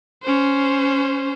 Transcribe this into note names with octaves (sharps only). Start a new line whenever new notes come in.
C#4 C5